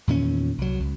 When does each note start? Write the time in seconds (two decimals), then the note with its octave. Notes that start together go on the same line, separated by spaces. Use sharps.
0.07 E2 A#2 D#3 C#4
0.58 C2 F#3
0.80 C#2